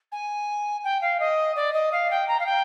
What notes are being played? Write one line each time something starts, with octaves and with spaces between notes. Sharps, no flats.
G#5
G5
F5
D#5
D5
D#5
F5
G5
A#5
F5
G5